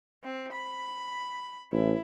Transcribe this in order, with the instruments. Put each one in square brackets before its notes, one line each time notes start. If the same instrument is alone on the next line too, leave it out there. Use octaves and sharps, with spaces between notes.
[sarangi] C4
B5
[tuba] A1 [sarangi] E4